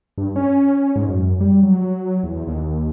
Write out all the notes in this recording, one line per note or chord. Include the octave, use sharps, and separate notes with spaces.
G2
C#4
G#2
F#2
G3
F#3
E2
D#2